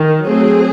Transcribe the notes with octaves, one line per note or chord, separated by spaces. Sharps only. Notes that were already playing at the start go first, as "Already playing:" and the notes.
Already playing: D#3
F#3 A3 C4 G#4